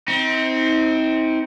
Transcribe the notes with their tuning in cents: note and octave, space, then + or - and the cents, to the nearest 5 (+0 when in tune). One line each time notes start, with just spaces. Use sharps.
C4 +0 D#4 +40